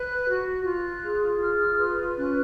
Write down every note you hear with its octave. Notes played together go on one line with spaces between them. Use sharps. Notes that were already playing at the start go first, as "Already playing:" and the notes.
Already playing: B4 F#6
F#4
F4 F#6
G#4
F4 F6
B4
C#4 F#6